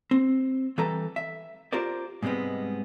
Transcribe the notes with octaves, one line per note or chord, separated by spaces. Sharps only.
C4
E3 G3 A4 B4 A#5
E5
F4 G4 A#4 C5 D5
G#2 C3 G3 G#3 B3